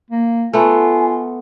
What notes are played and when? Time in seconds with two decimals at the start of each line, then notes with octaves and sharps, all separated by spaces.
0.11 A#3
0.53 A3 B3 F4 G#5